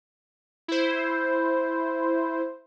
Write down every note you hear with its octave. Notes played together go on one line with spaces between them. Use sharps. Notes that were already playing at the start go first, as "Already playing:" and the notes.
E4 C5